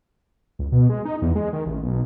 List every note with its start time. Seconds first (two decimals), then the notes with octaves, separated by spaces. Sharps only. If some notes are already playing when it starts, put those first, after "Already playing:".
0.59 C#2
0.72 B2
0.89 G#3
1.05 D#4
1.22 E2
1.35 G#3
1.53 D#3
1.65 A1
1.83 B1